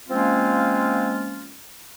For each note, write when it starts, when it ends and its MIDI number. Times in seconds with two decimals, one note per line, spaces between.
0.09 1.54 53
0.09 1.54 56
0.09 1.54 58
0.09 1.54 60
0.09 1.54 61
0.09 1.54 65